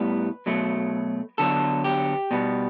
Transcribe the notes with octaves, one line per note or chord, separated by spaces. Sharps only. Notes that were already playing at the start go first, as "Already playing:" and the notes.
Already playing: A2 G3 B3 B4
B2 F#3 A3
D3 F#3 B3 A4
G4
B2 G3 B3